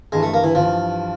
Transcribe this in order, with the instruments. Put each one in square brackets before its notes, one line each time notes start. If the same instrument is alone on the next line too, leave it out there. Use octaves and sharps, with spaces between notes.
[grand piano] G2 E3 G3 [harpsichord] G#3
[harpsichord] A3
A#3
E3
[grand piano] G2 E3 G3 [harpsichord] F3